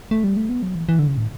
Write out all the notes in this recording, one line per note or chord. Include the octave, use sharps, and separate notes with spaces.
A3
G3
A3
B3
F#3
E3
E3
D3
C#3
A2